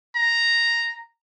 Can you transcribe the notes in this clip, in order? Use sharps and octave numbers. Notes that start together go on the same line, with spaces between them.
A#5